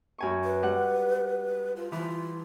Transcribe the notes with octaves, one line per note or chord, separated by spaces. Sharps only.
F#2 G#5 C#6
B4
G3 F#5
F4
E3 F4